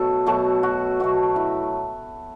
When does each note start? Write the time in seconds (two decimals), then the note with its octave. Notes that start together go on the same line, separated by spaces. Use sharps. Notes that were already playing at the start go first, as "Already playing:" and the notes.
Already playing: B2 F#3 A3 A4
0.26 B2 F#3 A3 A4
0.63 F#4
1.00 B2 F#3 A3 F#4
1.36 E4